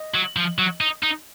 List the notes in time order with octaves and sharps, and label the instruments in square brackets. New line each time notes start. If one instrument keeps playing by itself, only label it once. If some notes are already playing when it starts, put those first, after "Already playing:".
Already playing: [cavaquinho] D#5
[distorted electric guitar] F#3
F3
F#3
D#4
D#4